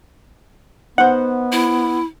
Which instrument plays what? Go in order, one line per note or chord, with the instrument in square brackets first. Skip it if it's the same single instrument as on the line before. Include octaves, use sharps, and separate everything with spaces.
[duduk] B3 [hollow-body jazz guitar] D#4 C5 [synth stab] F#5
[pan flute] E4